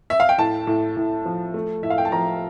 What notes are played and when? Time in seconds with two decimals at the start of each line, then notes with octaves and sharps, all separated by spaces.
0.10 E5
0.20 F5
0.29 G5
0.38 A2 A5
0.67 A2
0.97 A2
1.25 F3
1.54 A3
1.83 A2 E5
1.90 F5
1.98 G5
2.05 A5
2.12 F3 A#5